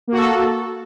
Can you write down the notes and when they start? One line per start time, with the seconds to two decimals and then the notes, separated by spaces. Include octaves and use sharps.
0.07 A#3
0.12 F#4
0.17 A4